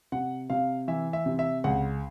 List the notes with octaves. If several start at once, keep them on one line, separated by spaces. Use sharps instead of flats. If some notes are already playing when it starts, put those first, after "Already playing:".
C3 F#5
C3 F5
E3 E5
E5
C3
E5
C#2 F#5